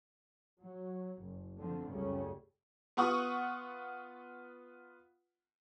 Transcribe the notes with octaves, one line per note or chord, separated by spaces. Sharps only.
F#3
F#1
D3 F3 A3 C4
C#2 F#2 C#3 G3 A3 C#4
B3 F4 F#5 C#6 D#6